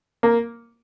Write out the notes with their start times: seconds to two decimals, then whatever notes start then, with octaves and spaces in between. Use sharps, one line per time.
0.23 A#3